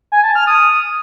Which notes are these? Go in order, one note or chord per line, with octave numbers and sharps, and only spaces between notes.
G#5
A5
F6
D#6